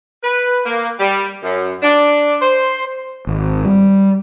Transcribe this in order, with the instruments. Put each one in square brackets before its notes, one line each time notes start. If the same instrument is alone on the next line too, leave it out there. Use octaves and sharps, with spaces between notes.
[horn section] B4
A#3
G3
F#2
D4
C5
[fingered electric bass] G#1
G3